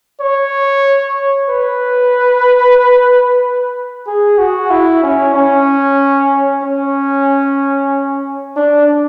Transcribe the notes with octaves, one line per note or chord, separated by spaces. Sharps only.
C#5
B4
G#4
F#4
E4
C#4
C#4
C#4
D4